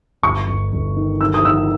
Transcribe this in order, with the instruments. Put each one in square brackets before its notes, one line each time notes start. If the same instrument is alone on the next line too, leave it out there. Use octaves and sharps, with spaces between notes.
[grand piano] G1 [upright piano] C#6
[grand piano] G1
G1
D#3
[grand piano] D#3 [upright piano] E6
[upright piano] D#6
[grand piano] D#3 [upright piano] E6